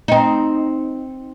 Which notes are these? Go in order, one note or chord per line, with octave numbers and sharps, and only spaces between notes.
C4 D#4